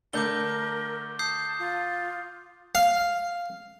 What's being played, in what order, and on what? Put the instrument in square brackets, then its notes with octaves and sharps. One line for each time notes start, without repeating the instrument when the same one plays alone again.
[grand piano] D3 A3 D4 [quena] A#4 [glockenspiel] D6 G6 G7
[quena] A5 [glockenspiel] D#6 G6 C7
[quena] F4
[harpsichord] F5